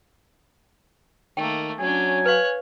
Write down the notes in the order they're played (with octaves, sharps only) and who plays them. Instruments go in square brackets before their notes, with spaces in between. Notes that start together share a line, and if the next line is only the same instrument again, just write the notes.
[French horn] D#3 [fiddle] A3 A#3 [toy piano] G5
[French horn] F#3 [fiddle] C#4 D4 [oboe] G#5
[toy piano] B4 F5 [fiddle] C#5 F#6